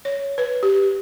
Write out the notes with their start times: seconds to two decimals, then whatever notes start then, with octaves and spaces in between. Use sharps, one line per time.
0.05 C#5
0.38 B4
0.63 G4